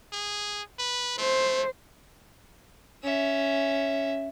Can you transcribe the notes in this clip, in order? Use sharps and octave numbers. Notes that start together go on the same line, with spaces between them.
G#4
B4
A3 C5
C#4 E5